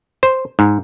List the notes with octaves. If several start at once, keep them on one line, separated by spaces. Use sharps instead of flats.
C5
G#2